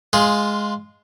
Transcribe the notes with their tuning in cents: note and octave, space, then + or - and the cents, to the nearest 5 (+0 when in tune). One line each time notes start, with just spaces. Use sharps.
G#3 +0 F4 +0 G#4 +0